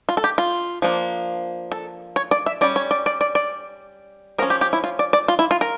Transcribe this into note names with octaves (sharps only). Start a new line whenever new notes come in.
F4
A4
G4
F4
F3 A#3 D4
A4
C#5
D5
E5
G3 C#4 D5
C#5
D5
D5
D5
D5
F3 C#4 A#4
G4
G4
E4
F4
D5
D5
F4
E4
F4
A#4